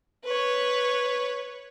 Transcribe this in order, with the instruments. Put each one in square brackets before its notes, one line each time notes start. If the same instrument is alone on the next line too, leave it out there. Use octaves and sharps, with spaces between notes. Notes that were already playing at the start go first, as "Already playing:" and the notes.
[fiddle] B4 C#5